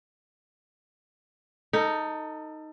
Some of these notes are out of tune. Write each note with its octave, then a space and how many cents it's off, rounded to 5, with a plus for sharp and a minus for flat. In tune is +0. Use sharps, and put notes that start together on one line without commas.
D#4 +0 A4 +25